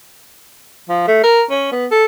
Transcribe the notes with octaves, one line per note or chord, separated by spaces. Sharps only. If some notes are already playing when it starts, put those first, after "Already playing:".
F3
A3
A#4
C#4
B3
A4